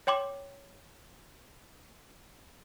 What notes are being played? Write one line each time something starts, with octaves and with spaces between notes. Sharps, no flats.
C#5 G5 C6 D6